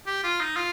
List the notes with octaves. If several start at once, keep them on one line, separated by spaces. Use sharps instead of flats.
G4
F4
D#4
F4